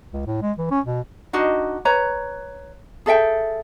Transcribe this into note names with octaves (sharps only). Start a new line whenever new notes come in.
C#2
A2
G#3
E3
C#4
B2
D4 D#4 F#4 D#5
B4 C#5 A#5
G#4 A4 E5 G5